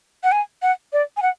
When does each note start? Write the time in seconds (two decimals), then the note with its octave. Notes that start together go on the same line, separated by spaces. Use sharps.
0.24 F#5
0.32 G#5
0.62 F#5
0.93 D5
1.17 G#5
1.22 F#5